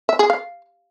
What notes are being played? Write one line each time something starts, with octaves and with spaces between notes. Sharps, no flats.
E5
G#4
F5